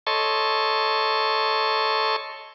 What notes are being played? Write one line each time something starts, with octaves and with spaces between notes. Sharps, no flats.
A4 C#5 D#5 A5 C6 C#6